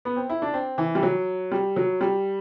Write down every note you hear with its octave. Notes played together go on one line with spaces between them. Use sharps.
B3
C4
E4
D4
C4
E3
G3
F#3
G3
F#3
G3